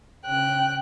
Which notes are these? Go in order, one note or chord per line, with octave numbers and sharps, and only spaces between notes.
C#3 G5 F#6